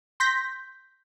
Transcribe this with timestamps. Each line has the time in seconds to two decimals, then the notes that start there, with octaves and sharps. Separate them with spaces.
0.20 C6 G6 A#6 B6